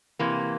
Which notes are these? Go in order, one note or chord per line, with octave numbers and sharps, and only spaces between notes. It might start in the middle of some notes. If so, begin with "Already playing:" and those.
C3 E3 A#3